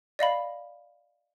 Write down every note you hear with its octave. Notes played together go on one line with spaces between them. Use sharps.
D5 D#5 F5 B5